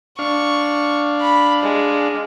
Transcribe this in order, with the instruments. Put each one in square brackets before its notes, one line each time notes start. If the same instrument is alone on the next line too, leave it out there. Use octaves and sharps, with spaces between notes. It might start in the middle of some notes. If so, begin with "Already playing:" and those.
[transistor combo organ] D4 F5 [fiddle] C#6
[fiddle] B5
G#3